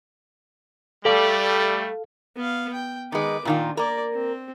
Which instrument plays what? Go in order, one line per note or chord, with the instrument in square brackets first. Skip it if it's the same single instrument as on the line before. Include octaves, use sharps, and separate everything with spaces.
[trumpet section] G3 A3 [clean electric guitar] G4 D5 [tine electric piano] A4 F5
[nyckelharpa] B3 F5
G5
[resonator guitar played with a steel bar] D#3 G#3 [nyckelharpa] B4 D6
[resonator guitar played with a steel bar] A#2 D#3 F4 [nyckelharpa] D4
[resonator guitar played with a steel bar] A#3 A#4 [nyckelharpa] D5
[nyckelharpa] C4